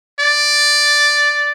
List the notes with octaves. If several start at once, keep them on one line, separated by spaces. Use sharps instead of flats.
D5